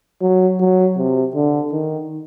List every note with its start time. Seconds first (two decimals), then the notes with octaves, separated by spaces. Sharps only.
0.22 F#3
0.60 F#3
0.97 C3
1.35 D3
1.72 D#3